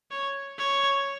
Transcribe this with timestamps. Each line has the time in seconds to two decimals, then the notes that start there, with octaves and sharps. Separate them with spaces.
0.11 C#5
0.58 C#5